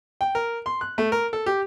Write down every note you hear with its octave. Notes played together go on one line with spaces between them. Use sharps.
G5
A#4
C6
F#6
A3
A#4
A4
G4